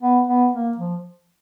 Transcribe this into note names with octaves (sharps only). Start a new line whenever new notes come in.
B3
B3
A#3
F3